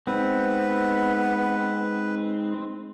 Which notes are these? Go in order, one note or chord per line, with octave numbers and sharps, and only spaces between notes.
G#3 B3 C4 D#4 B4